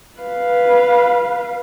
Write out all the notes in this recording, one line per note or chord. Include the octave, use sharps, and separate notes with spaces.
B4 F5